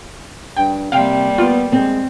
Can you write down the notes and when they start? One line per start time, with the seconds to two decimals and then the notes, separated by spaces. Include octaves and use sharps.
0.57 G2 G5
0.92 C3 G3 A#3 F5 G5
1.38 B3 F4
1.72 G#3 C4